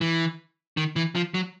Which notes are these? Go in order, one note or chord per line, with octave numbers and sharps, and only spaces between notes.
E3
D#3
E3
F3
F#3